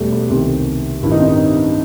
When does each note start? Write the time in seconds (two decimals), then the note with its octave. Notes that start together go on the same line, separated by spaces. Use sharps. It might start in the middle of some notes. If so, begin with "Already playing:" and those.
Already playing: E1 E2 B2 G3 A3
0.12 B3
0.30 C2 C3 D#3 C4
1.03 A1 G2 D#3 E4
1.11 D#4
1.19 C4
1.27 D#4